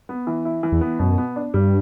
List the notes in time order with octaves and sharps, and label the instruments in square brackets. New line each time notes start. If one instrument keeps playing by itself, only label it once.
[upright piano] B3
E3
E4
E3
[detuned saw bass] E2
[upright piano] B3
[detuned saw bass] F#2 [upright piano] B2
[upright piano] B3
D4
[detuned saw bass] G2 [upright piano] G3